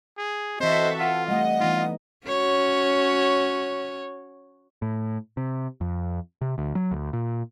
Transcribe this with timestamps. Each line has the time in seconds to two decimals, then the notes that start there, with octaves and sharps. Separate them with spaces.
0.18 G#4
0.60 E3 C4 F#4 A4 C5 D#5 E5
0.99 F4 F#5
1.28 G3 A3 D#5 F#5
1.60 E3 B3 D#4 F4
2.27 C#4 F#4 C#5
4.82 A2
5.37 C3
5.81 F2
6.41 C3
6.58 D2
6.75 F#3
6.91 D2
7.13 A#2